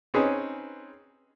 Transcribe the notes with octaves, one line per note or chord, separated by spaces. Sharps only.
C4 C#4 D#4 G#4 B4